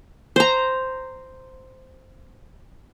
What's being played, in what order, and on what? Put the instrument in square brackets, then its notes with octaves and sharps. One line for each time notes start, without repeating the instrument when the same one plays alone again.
[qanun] C5 A#5